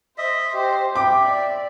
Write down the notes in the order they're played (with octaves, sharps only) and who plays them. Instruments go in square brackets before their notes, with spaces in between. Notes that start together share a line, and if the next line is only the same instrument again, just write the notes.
[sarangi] C5 [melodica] D#5 E5
[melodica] G4 [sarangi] C5
[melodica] E5 [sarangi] G5 [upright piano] D6
[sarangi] D5